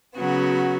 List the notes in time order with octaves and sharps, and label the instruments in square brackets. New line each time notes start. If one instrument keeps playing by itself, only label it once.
[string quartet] C#3 F#3 B3 F#4